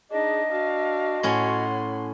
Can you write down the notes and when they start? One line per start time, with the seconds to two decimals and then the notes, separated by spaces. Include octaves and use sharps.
0.11 D4 D#4 G#4 D#5
0.51 D4 F#4 F5
1.23 A2 C#4 C#5 F#5 C6